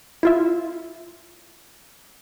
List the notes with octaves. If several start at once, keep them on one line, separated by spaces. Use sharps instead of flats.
E4 F4 E5